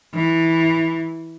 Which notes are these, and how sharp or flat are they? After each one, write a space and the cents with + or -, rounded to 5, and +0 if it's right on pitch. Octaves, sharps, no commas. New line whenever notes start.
E3 -10